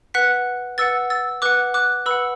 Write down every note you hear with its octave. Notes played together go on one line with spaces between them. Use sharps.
B4 F#5 F#6 B6
B4 F#5 E6 A6
E6 A6
B4 F#5 D6 F#6
D6 F#6
B4 F#5 B5 E6